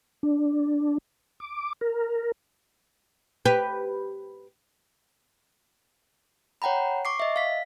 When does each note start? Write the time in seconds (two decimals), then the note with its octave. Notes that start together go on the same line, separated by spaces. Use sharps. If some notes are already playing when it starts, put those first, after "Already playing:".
0.23 D4
1.40 D6
1.81 A#4
3.45 G4 B4
6.62 C#5 F#5 G5 A#5 B5
7.05 C#6 D6 C7
7.20 D#5 E5
7.36 F5 B6